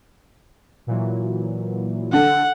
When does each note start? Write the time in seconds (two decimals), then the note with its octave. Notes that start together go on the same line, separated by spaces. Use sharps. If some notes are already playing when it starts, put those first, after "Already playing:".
0.87 A#2 E3 F#3
2.13 D3 A4 F#5